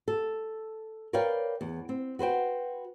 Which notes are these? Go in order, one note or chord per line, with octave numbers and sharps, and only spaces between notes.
A4
A#4 B4 C#5 D5 F5 G5
E2
C4
F#4 B4 C5 G5